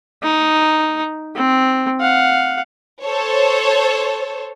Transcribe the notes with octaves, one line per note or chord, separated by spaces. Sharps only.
D#4
C4
F5 F#5
A4 C5 C#5